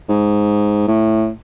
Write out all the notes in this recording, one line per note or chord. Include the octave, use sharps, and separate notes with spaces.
G#2
A2